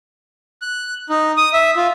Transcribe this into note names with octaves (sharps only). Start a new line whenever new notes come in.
F#6
D#4
D#6
E5
F4